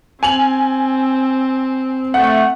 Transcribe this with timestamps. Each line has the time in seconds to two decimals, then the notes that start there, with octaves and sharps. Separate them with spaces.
0.23 C4 G#5 F7 F#7
2.14 A3 F#5